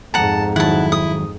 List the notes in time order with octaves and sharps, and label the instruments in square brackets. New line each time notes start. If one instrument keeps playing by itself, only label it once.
[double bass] F2 G#2 [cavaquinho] F#5 A#5 [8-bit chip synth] A5
[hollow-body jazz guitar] D#3 F#3 [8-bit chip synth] E4 [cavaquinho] F#5 A5
[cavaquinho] D#6